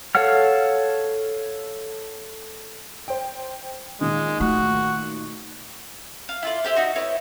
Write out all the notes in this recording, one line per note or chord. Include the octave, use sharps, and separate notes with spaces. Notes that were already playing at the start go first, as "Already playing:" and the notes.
A4 C#5 F5 F#5 F6
C5 G5
A#2 D#3 G#3
A3 F#4
F5
E4 F4 D5
E4 G4 C5
D#4 F#4
E4 B4 C#5